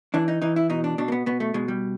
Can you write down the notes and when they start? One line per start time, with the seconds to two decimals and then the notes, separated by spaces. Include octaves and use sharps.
0.14 E3 D4
0.28 D#4
0.42 E3 D#4
0.56 E4
0.70 B2 D#4
0.84 D4
0.98 B2 D4
1.08 A#3
1.12 B3
1.26 B2 B3
1.40 A3
1.54 B2 G#3
1.68 G3